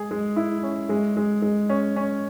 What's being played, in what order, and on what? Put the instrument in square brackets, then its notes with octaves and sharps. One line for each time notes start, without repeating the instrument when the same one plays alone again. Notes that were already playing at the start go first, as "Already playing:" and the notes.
Already playing: [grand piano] G#3 G#4
G#3
E4
C#4
G#3
G#3
G#3
C#4
C#4